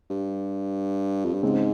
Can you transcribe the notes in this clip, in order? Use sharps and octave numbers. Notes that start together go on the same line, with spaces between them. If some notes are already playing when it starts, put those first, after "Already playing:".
G2
F2
G2
G#2 C#3 G#3 C4